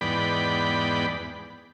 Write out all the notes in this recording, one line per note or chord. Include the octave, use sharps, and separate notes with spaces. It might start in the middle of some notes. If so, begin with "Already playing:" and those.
E2 G#2 B3 D5 G5 B5